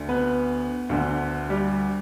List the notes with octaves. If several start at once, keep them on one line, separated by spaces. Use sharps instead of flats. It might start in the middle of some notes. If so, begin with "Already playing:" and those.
Already playing: D2 D3
B3 B4
D2 D3
G3 G4